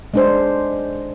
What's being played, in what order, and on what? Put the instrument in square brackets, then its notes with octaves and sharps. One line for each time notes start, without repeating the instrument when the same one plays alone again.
[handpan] G#3 D4 C5